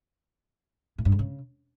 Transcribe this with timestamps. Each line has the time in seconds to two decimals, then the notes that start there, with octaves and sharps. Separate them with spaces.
0.98 A2
1.05 G2
1.12 G#2
1.19 C#3